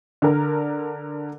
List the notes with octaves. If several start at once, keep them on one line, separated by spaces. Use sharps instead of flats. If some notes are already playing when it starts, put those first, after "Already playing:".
D3 A#4